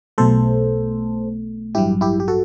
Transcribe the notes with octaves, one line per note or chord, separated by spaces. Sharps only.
B1 B2 A3 A4 C5
A1 G2 F#3 E4 G4
E4 G4
G4
F#4 A4